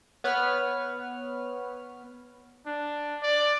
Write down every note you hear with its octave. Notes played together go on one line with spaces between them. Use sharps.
B3 B4 C#5 F6
D4
D5